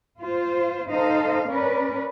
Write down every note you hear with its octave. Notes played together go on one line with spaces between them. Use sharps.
F4 C5
D#4 A4 C5 D#5 F5
C#4 A#4 B4 D5